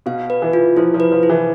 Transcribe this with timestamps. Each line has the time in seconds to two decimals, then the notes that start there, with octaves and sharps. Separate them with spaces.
0.06 B2 F5
0.30 B4
0.42 E3
0.53 F4
0.77 F3 E4
0.94 F3
1.00 B4
1.12 F3
1.23 E4
1.30 E3